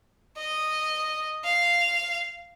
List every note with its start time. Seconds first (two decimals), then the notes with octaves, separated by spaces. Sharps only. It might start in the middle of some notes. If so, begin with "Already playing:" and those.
0.38 D#5
1.45 F5